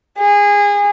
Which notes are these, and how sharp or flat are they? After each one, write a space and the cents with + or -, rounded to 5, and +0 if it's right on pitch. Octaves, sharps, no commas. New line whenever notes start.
G#4 -25